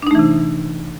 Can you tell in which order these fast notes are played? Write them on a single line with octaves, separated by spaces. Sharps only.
D4 D#4 A3 E3 C3